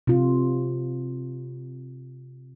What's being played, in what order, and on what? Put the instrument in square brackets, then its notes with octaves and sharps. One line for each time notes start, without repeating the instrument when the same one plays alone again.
[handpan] C3 F4